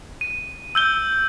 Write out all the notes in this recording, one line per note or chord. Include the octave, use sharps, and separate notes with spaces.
D#7
E6 G6 G7